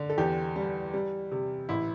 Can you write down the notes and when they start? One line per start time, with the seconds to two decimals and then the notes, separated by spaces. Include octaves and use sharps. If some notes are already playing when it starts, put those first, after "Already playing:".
Already playing: D3
0.10 A4
0.18 E2 G4
0.56 G3
0.94 G3
1.32 C3
1.69 A1 E4